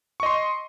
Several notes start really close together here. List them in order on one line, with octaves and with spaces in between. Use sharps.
C#6 D#5 C6